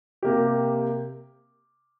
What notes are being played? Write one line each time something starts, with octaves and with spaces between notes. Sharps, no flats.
C3 A#3 G4